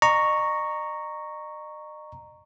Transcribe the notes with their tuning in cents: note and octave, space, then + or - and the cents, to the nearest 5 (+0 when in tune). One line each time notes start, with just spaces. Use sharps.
D#5 -40 A#5 -5 C#6 +0